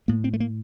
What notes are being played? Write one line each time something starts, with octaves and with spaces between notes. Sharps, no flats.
A2 A#3
C4
A3
A#3